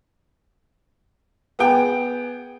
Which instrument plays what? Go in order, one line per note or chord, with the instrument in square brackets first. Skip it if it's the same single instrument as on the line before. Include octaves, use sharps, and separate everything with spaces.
[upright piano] B3 G#4 G5